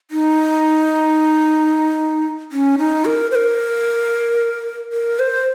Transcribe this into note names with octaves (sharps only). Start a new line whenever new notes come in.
D#4
C#4
D#4
A#4
C5
A#4
A#4
C5